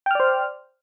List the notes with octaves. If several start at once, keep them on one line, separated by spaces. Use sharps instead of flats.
C5 D5 G5 F6